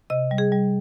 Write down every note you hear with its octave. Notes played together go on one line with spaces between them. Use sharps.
C3 D#5
G3
G#4
G3